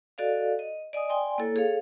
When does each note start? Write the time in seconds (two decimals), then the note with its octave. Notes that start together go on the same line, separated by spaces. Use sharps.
0.18 F#4 A4 D5 D#5 F5
0.59 D#5
0.93 D5 D#5 G#5 D#6
1.09 D5 G5 G#5 C6
1.38 A#3 E4 A4 C#5
1.56 G#4 A4 C#5 F5